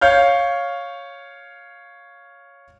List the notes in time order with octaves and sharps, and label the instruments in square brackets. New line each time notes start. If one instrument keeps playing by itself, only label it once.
[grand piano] C#5 F5 F6 G6